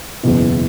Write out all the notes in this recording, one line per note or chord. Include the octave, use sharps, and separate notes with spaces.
F#1 E2 B2